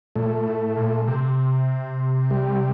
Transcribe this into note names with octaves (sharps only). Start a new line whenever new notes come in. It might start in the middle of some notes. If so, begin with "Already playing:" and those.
A#2 A3
A2
A#2
C3
G3